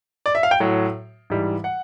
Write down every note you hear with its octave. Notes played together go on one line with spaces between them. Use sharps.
D5
E5
F5
G5
A2 F#3
G#2 E3 G3
F#5